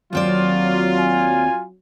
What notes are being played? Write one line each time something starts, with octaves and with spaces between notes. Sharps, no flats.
D#2 F#3 C4 F4 D5
G#5